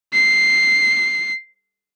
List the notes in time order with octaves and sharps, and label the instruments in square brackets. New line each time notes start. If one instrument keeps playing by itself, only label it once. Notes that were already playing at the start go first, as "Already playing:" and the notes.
[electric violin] C7